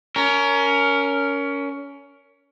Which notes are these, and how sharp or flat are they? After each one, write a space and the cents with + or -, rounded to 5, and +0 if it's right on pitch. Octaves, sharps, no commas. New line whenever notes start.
C#4 +20 A#4 -5